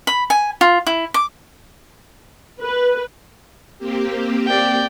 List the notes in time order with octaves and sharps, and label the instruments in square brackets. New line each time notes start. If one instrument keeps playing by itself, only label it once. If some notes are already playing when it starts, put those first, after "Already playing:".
[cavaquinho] B5
G#5
F4
E4
D6
[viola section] B4
[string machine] A#3 C4 G4
[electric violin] D5 G5